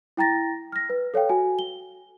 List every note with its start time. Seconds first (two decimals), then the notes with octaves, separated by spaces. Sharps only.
0.17 E4 G5 A#5 A6 A#6
0.72 F6 A#6
0.90 B4
1.14 A4 C#5 F5 G5
1.29 F#4 G#5
1.59 G7